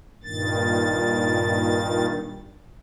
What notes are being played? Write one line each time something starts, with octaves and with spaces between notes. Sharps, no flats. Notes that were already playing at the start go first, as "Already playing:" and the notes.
G2 A#2 D#3 A6